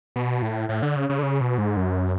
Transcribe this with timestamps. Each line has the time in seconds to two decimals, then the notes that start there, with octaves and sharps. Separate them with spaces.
0.16 B2
0.42 A2
0.69 A2
0.82 D3
0.96 C#3
1.09 C#3
1.19 D3
1.23 C#3
1.41 B2
1.58 G#2
1.77 F#2